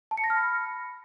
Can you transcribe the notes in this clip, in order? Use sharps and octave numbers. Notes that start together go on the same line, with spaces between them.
A5
C#7
A#6
F6
B5